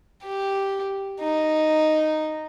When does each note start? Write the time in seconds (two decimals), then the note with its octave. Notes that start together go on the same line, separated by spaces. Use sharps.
0.23 G4
1.21 D#4